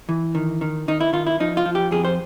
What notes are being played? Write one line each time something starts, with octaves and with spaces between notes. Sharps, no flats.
E3
D#3
D#3
D#3 D#4
E4
D#3 F4
E4
F3 D#4
F4
F3
G4
F2 G#4
C5